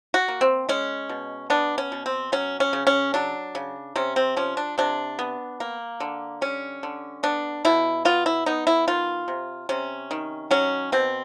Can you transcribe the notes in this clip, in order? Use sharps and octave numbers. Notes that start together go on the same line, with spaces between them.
F#4
A#3
C4
G#3 C#4
B2
B3 D4
C#4
B2
C4
F#3 C#4
C#4
C#3
C#4
F#3 D4
C#3
C3 C#4
C4
F3 C#4
D4
C3 D4
B3
A#3
D3
G3 C#4
D3
B3 D4
B2 E4
B3 F4
E4
B3 D#4
E4
D#3 F4
C3
C3 C#4
D#3
F#3 C#4
B2 C4